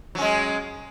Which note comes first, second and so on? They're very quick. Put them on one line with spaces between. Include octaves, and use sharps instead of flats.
F#3 C#4 G#3